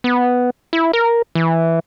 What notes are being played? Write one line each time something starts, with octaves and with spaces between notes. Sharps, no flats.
B3
E4
A#4
E3